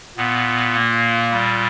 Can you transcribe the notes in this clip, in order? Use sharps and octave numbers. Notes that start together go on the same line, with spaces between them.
A#2 B3
A#3
G3